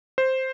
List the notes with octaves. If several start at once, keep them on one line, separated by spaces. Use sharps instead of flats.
C5